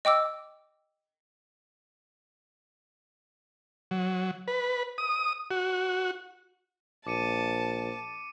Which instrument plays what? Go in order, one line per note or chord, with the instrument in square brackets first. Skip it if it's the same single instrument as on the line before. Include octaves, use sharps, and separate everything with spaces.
[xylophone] D#5 G5 D6 E6
[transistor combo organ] F#3
B4
D#6
F#4
[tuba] A#1 [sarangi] A5 [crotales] D6 C#7 D#7